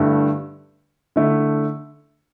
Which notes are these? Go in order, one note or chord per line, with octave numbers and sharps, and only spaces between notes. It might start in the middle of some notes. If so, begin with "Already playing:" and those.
Already playing: G2 D3 A3 E4
D3 A3 E4